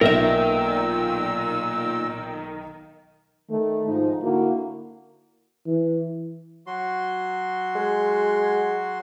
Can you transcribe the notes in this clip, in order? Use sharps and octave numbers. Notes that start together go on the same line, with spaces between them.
B1 A#2 D#3 A#4 E5 E6
D#3 A3
G#2 F3 D#4
D3 A#3 E4 F#4
E3
F#3 F#4 C6
G#3